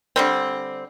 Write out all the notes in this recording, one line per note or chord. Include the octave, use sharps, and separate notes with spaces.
D3 G3 C4